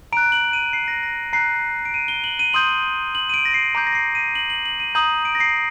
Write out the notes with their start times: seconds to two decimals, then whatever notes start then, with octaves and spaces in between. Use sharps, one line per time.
0.13 A#5 F#6 D7
0.32 F#7
0.53 D#7
0.73 C7
0.88 A#6
1.03 A#6
1.33 A#5 F#6 C7
1.85 D7
1.94 D#7
2.08 G7
2.24 F#7
2.39 D#7
2.53 C6 D#6 G6 F#7
3.15 F#7
3.29 D#7
3.34 D7
3.45 A#6
3.54 C7
3.75 A#5 D6 G6
3.87 A#6
3.95 C7
4.15 D#7
4.35 F#7
4.50 F#7
4.66 F#7
4.80 D#7
4.95 A#5 D#6 G6 F#7
5.25 D7
5.35 A#6
5.40 C7